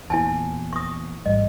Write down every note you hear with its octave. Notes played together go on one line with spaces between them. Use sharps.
E2 A#2 E4 G#5 A5
C#6 D#6
A1 G#2 G3 D#5